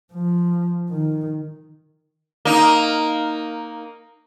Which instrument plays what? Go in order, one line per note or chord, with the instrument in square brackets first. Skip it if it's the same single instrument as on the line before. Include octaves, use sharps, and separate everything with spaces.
[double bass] F3
D#3
[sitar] A#3 D#4